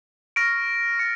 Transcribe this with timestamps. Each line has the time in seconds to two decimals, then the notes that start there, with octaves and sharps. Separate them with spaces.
0.36 C#6 F6 A#6 D7
0.99 C#6 A6 C#7